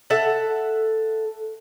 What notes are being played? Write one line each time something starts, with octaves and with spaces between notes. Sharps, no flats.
A4 E5 F#5